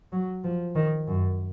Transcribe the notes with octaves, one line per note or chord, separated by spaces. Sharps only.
F#3
F3
D#3
F#2